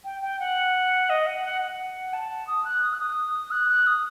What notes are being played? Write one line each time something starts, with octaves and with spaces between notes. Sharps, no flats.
G5
G5
F#5
D#5
F#5
F#5
F#5
A5
D#6
F#6
D#6
F#6
D#6
F#6
F#6
D#6